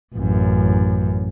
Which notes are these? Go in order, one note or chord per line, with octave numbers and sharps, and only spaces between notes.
A1 F#2